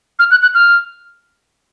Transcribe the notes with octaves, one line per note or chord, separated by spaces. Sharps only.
F6
F#6
F#6
F6